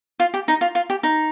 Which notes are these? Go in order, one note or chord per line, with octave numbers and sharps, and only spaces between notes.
F4
G4
D#4
F4
F4
G4
D#4